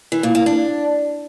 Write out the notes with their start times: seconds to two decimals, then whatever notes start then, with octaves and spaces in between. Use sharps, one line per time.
0.12 E3
0.23 A#2
0.35 A#3
0.46 D4